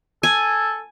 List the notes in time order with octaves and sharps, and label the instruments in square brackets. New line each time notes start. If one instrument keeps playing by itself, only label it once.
[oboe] A4 [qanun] G#5